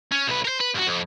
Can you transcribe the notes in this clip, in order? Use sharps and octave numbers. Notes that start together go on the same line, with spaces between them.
C#4
B1 B4
A#4 C5
B4
G2 F#4
F2